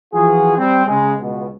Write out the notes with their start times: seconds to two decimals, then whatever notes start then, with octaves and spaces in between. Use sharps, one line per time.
0.14 E3 F3 B3 F4 F#4 G#4
0.58 G3 C4
0.87 C#3 G#3
1.20 C#2 B2